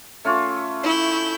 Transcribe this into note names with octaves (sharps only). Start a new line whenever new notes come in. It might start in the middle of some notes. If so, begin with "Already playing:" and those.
A3 C#4 F4
E4 G6